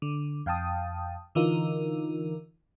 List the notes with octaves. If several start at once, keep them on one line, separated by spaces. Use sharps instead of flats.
D3
F2 F5 G5 A5 D#6
D3 E3 D#4 F4 A#4